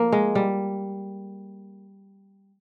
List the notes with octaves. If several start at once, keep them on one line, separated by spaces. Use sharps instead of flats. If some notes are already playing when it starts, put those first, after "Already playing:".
Already playing: F3 A#3
G#3
G3